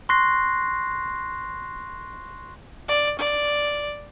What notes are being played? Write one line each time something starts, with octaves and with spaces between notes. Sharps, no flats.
C6 C#6 F#6 A#6 C7
D5
D5